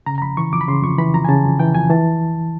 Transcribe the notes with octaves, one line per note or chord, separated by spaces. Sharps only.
C#3 A#5
A#5
F2 B5
E3 C#6
F2 D6
B5
C#3 C6
F2 C#6
E3 B5
F2 A#5
G#5
C#3 A5
F2
E3 G5
F2 G#5
E3 A5